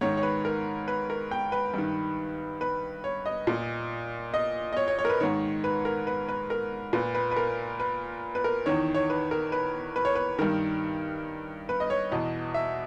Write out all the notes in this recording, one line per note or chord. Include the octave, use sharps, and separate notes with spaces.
G#2 D#3 C#5
C#5
B4
A#4
B4
A#4
G5
B4
G2 D#3
B4
C#5
D#5
A#2
D#5
D#5
C#5
C#5
C#5
A#4
B4
G#2 D#3 C#5
B4
A#4
B4
B4
A#4
A#2 B4
B4
B4
A#4
B4
B4
A#4
E2 D#3 C#5
C#5
B4
A#4
B4
B4
C#5
B4
G2 D#3 A#4
B4
D#5
C#5
E2 B2 D#5
E5